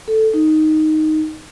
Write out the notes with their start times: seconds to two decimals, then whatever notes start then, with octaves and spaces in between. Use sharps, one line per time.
0.08 A4
0.34 D#4